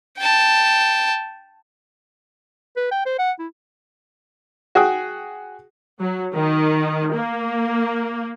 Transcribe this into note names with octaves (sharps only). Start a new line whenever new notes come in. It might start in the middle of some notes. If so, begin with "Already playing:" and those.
G5 A5
B4
G5
C5
F#5
E4
F#4 G#4 G5 D#6
F#3
D#3
A#3